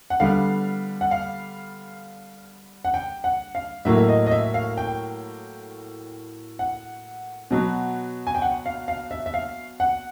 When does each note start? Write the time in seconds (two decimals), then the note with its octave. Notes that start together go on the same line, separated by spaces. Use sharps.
0.10 F#5
0.20 D3 G3 B3 F5
1.01 F#5
1.11 F5
2.85 F#5
2.94 G5
3.24 F#5
3.55 F5
3.85 A2 F#3 A#3 E5
3.98 E5
4.08 D#5
4.26 D#5
4.31 E5
4.54 F5
4.77 G5
6.59 F#5
7.51 B2 F#3 B3
8.27 G#5
8.35 G5
8.42 F#5
8.66 F5
8.88 F5
9.11 E5
9.26 E5
9.34 F5
9.80 F#5